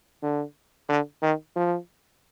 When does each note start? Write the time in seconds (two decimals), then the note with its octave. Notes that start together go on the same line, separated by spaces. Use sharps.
0.22 D3
0.89 D3
1.22 D#3
1.56 F3